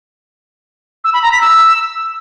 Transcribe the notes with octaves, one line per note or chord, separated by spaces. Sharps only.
E6
B5
A#5
B6
E6